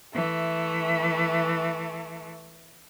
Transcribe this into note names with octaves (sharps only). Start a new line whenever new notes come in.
E3 A3